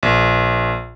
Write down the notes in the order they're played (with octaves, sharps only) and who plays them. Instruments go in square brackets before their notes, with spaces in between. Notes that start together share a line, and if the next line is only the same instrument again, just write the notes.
[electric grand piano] A#1